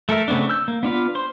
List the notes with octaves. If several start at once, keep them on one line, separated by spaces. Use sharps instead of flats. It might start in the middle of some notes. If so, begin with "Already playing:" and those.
A3 A4 A#4 E5
C#3 A3 B3 C4 D4
E6 G6
A#3
B3 D4 F4 B4
C5 C6